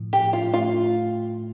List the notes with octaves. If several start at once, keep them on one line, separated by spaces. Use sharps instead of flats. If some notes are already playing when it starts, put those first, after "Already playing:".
Already playing: A2 F3
G4
A2
F4
A3 F4